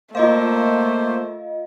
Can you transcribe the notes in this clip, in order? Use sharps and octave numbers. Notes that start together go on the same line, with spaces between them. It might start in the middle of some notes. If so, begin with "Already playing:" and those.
A3 A#3 F4 C5 D#5 F5